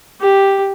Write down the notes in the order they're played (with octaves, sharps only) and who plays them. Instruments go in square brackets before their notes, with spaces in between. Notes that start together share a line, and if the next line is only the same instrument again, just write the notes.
[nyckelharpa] G4